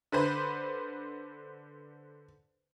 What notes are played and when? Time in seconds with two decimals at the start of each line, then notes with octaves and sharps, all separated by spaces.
0.12 D3 B4 C5